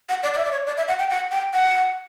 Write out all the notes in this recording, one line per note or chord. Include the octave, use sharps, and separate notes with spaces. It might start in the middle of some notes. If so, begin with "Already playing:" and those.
F#5
D5
D5
E5
D5
C#5
D5
E5
F#5
G5
F#5
G5
F#5